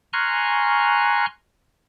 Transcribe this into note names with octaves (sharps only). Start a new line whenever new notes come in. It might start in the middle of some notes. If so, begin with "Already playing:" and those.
G#5 A#5 C6 C#6 F6 F#6